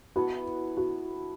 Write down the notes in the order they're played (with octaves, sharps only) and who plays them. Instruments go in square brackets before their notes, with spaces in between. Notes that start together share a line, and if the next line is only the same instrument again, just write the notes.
[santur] B3 E4 A4 [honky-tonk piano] F#4
[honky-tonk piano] F#4